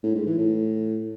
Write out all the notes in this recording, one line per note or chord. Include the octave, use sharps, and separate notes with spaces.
A2
G#2
E3
A2